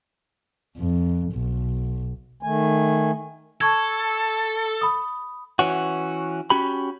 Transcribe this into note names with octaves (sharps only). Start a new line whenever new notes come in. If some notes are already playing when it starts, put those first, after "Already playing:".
F2
B1
D#3 A3 G#5
A4 A5 C#6 G#6
B5 D#6
E3 C#4 F#4
C#4 F#4 G4 B5